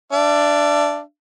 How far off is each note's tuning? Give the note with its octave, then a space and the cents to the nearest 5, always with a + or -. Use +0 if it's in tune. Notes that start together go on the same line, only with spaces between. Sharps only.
D4 +0 E5 +40